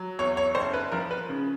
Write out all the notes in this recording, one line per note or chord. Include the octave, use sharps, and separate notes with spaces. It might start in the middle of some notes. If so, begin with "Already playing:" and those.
Already playing: F#3
E2 C#5
C#5
F#1 C5
B4
F3 A#4
B4
C#3